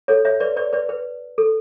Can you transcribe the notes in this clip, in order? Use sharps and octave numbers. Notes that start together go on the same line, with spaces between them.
A4 C#5
C#5 E5
B4 D5
B4 D5
B4 D5
B4
A4